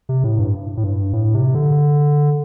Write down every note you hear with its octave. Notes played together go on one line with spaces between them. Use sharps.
C3
A2
G2
A2
G2
A2
C3
D3